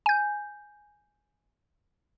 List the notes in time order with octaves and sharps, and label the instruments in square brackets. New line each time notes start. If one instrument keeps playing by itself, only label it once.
[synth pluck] G#5 G6